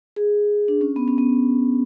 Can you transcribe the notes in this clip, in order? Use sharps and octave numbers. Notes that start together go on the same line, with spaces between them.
G#4
D4
C#4
B3
C#4
B3